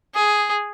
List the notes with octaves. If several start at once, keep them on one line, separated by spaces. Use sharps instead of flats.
G#4